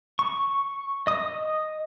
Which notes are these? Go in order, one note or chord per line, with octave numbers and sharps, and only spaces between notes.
C#6
D#5 D#6